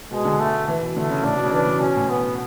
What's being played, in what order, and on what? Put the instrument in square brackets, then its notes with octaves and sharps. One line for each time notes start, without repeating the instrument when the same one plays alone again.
[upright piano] B2 [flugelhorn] G#3
[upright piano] D3
[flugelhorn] A3
[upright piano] E3
B2
[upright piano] D3 [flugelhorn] A3
[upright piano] C#3
[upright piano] A2 [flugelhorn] D4
[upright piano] B2
C#3
[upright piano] E3 [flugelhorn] D4
[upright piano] F#3
[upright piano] B2 [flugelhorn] C#4
[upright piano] A2
[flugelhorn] B3